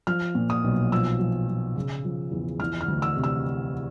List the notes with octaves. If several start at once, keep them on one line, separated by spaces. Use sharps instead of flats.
F3 F6
A#2
D#6
B1
F3 E6
F3
F3
C#3
F3
E2
E3 F6
F6
D2
E6
C3
E6